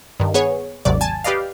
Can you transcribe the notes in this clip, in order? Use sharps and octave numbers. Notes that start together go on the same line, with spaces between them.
G2 D#3
B3 G#4 C#5
G#1 D#2 C3 F#3 D5
G#5 A5
G4 B4 D5 D#5 F5